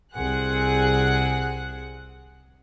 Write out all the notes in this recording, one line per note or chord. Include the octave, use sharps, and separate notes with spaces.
C2 C4 G#4 F#5 F#6